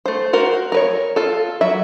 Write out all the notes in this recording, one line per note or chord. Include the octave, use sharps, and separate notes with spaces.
A3 C5
F#4 A#4 C5
A#4 B4 C#5
F4 A4
F#3 E5